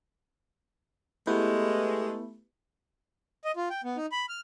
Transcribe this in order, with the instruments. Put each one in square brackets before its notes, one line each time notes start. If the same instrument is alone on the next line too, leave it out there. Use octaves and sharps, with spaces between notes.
[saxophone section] G#3 [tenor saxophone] A3 [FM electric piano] B3 E4 B4 [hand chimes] G4 G6
[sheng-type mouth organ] D#5
F4
G5
B3
D#4
B5
F6